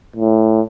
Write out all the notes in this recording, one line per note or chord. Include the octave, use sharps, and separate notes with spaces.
A2